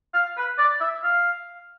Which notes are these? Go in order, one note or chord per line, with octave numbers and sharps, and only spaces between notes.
F5
B4
D5
E5
F5